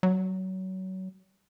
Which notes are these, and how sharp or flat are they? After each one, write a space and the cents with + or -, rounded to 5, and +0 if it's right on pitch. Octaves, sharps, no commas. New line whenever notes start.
F#3 +25